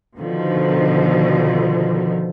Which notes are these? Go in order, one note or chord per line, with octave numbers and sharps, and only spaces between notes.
B2 D3 D#3 F3